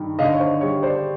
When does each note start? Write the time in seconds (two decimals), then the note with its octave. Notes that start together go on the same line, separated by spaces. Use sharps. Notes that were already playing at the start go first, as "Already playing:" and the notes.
Already playing: G2 D#3
0.19 D3 D#5 F5
0.34 C#5
0.40 C5
0.61 G3 C#5
0.82 C5 D5